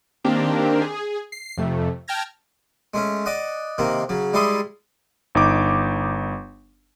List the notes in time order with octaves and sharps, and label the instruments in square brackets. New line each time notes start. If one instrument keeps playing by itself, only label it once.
[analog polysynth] D#3 A#3 C4 D4 G4 A#4
G#4
C7
F2 C3 A3
G5 A5 F6 G#6 A#6
[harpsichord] G#3 A3 C#4
D5 D#5 F#5
C3 D#3 A#3 C4
C#3 F#3
G3 G#3 E4 A5 C6 D#6
[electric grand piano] G1 D#4 D6